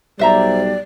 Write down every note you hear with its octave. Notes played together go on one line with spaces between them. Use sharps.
B1 G3 C5 D5 E5 A#5